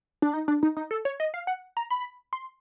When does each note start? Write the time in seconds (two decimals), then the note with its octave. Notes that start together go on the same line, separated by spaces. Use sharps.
0.22 D4
0.34 D#4
0.48 D4
0.63 D#4
0.77 D#4
0.91 A4
1.05 C#5
1.20 D#5
1.34 F5
1.47 F#5
1.77 A#5
1.90 B5
2.33 C6